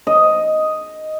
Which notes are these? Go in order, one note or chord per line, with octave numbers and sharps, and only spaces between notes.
D#5